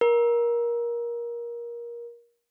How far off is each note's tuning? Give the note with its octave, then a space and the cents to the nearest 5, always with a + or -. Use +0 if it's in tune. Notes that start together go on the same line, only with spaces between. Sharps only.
A#4 +20